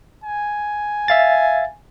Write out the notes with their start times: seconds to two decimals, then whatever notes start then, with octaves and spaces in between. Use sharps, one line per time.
0.24 G#5
1.08 E5 F5 A6